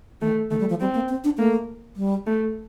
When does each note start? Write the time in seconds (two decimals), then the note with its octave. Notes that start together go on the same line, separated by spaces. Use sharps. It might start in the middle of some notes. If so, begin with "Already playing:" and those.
0.21 D#3 A3
0.51 D#3 A3
0.60 G3
0.70 F3
0.80 G3 C4
0.95 A#3
1.09 C4
1.24 D4
1.38 A3 A#3
1.97 G3
2.27 A3